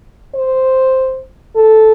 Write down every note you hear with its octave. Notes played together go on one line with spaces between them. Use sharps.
C5
A4